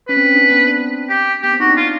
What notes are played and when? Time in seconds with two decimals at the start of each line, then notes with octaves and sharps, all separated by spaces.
0.08 C#4 B4
0.17 C4
0.26 C#4
0.34 D4
0.42 C4
0.50 B3
0.60 C4
0.67 D4
0.75 C4
1.09 G4
1.43 B3 G4
1.52 C4
1.60 D#4 F#4
1.69 D4
1.77 F4